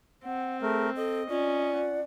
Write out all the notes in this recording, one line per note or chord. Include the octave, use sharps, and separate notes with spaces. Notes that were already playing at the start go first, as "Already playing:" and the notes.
C4 F#5
A3 G#4 A#4
A4 D#5
C#4 F4 D5
F#5